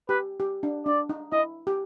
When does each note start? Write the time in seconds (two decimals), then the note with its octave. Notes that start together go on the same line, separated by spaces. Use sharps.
0.09 G4 B4
0.40 G4
0.63 D4
0.86 D4 D5
1.09 D#4
1.32 E4 D#5
1.67 G4